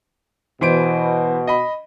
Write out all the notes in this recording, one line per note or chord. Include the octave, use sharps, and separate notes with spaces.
B2 E3 C5 D7
D#5 B5